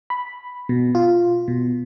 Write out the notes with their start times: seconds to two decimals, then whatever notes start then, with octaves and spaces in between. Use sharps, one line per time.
0.10 B5
0.69 B2
0.95 F4
1.48 B2